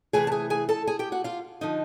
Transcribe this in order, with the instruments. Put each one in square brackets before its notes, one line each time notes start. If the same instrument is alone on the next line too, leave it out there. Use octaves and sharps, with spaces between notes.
[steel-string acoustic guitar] C3 E3 A3 G#4 G#5
A5
G#4 G#5
G#4 G#5
A4 A5
G#4 G#5
G4 G5
F#4 F#5
F4 F5
D3 F3 D#4 D#5